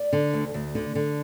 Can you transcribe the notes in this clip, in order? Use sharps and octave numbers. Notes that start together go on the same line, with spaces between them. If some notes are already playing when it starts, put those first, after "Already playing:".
Already playing: D5
D3
D2
D2
D3
D3